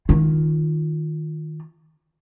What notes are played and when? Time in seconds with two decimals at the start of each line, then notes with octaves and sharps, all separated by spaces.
0.09 D#3 F4